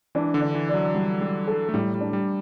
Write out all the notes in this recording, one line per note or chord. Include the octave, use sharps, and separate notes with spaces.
E3 D4
D3
D4
E3
D5
F#3
G3
G3
A4
A3
A2 G3
G3
D4
G3